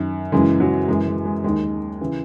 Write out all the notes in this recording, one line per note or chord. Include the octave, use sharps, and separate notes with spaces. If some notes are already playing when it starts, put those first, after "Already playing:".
Already playing: F#2 D#3
F#2 C#3 E3 G#3
F#3
F#2 E3 G#3
G#3
G#3
D#2 D#3 G#3
C#3 E3